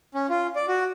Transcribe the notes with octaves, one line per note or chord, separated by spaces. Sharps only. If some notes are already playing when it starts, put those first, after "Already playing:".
C#4
F4
D5
F#4